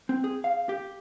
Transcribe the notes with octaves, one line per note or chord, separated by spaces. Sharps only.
C4
G#4
F5
G4